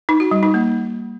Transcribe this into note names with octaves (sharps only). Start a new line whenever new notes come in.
D#4
F#4
G3
D#4
A#3